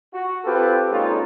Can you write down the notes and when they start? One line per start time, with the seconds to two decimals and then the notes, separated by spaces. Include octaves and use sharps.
0.13 F#4
0.45 C4 F4 G4 A4 B4
0.91 A#2 G#3 C#4 D#4 F4 A4